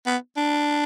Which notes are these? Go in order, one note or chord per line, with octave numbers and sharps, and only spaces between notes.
B3
D4